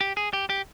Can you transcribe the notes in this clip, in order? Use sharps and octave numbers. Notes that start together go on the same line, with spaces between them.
G4
G#4
G4
G4